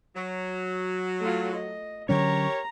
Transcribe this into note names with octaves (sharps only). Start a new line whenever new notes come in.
F#3
A3 F4
D#5
D3 F#3 C#4 G4 A#4 C#5 A#5